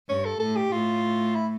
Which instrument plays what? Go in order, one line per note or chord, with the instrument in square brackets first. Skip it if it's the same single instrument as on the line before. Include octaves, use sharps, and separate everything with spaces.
[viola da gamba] G2 [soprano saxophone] C#5
[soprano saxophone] A4
[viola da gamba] A2 [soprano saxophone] A4
[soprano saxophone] G4
[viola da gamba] A2 [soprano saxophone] F4
[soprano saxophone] E4